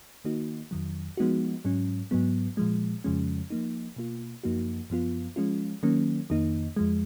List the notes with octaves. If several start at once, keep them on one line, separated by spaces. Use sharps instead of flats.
D#3 A#3 D#4 F#4
F2 D#3 F#3
F3 G#3 B3 D#4 F#4
G#2 F#3 C#4
G#2 F#3 B3
A#2 F3 G#3
F2 C#3 F3 G#3 C#4
F3 A#3 D#4
B2 A#3 F4
F#2 F3 A#3 D#4 F#4
F#2 F3 B3 F4
F3 G#3 C#4 F4
D#3 F#3 A#3 C#4
F2 D#3 A#3 D#4
F2 F3 G#3